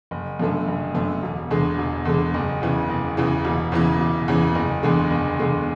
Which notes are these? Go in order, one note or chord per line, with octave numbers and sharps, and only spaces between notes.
F#1
F#2 D3 A3
F#1
F#2 D3 A3
E1
E2 D3 G#3
E1
E2 D3 G#3
F#1
E2 C#3 E3
F#1
E2 C#3 E3
E1
E2 C#3 E3
E1
E2 C#3 E3
F#1
E2 D3 G#3
F#1
E2 D3 G#3